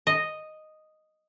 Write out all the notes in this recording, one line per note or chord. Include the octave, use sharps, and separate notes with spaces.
D#5